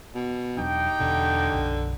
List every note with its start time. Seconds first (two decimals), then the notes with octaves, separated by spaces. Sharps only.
0.15 B2
0.57 E1 F#3 D4 D#4 G4 G5
1.00 E1 E2 B2 D3
1.53 B1 F#2